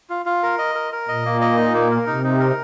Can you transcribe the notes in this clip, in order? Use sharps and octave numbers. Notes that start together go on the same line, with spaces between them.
F4
F4
A#4
D#5
A#4
A#4
A#2 D#5
A#3
D#5
D#4
A#3
A#4
C3 D#4
D#4
A#4